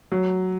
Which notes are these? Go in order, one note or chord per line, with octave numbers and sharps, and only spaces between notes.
F#3